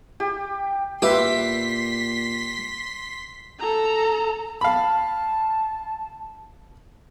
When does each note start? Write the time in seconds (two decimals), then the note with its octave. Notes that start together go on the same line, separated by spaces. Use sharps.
0.20 G4
1.02 A#2 F4 G4 B4 E5 C6 B6
3.60 A4 A#5
4.61 F5 A5 B5